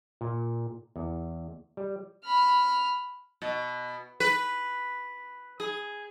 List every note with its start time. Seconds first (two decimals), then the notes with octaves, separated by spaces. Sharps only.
0.21 A#2
0.96 E2
1.77 G3
2.24 B5 F6
3.42 B2
4.20 B4
5.60 G#4